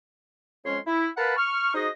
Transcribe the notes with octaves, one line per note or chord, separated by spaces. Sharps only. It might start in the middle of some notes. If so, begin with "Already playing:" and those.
F2 G#3 C#4 C#5 C6
E4
A#4 B4 F5 F#5 A5 B5
C#6 F6
D#4 F#4 G#4 C5 D#5